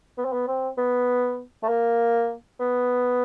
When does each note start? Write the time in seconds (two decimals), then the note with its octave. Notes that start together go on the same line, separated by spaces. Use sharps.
0.18 B3
0.25 C4
0.33 B3
0.48 C4
0.78 B3
1.63 A3
1.69 A#3
2.60 B3